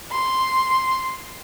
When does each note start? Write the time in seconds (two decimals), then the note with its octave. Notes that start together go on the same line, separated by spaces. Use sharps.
0.10 C6